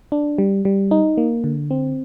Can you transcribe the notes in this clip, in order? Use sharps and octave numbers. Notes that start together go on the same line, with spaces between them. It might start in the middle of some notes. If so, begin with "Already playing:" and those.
D4
G3
G3
D#4
A#3
D3
C4